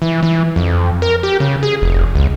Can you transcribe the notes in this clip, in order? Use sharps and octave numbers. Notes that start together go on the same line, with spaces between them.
E3
E3
F2
A#4
G4
C#3
G#4
F1
C#2